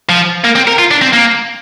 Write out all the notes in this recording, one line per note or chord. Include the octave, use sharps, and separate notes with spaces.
F3
A#3
C4
A#4
F4
D4
C4
A#3